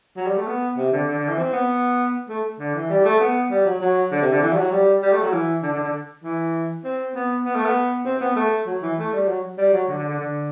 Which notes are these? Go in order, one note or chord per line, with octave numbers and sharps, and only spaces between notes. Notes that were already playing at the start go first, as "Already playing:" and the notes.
F#3
G3
A3
B3
C3
D3
D3
D3
E3
C4
B3
A3
D3
E3
G3
A3
B3
G3
F#3
F#3
D3
C3
D3
E3
G3
F#3
G3
G3
A3
F#3
E3
D3
D3
D3
E3
C4
B3
B3
A3
B3
C4
B3
A3
F#3
E3
A3
G3
F#3
G3
F#3
D3
D3
D3
D3